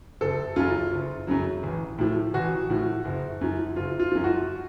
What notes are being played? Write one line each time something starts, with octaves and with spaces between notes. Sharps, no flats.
F#1 A4
F#2 C#3 F#3 F4
F#1
F#2 C#3 F#3
A1
A2 F3
A1 F#4
A2 F3
F#1
F#2 F3
F#1 F4
F4
F#2 F3
F#4